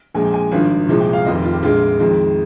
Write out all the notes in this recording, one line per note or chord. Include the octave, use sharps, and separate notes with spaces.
A#1 A#2 F3 G#3 G#5
G5
G#5
G#1 G2 F3
C2 A#2 F3 G#3
G5
F5
F1 F2 D#3 D#5
G4
F4
G4
A#1 A#2 G#3 F4
F2 D#3 G#3